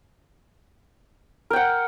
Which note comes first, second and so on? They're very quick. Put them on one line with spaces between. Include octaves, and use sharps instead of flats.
A#4 G5 F#5